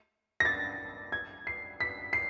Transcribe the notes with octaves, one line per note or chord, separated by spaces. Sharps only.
A#6
A6
G#6
C7
B6
C7